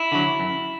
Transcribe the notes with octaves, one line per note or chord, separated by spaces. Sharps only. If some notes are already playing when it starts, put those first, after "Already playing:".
Already playing: E4
D3 F#3
F#2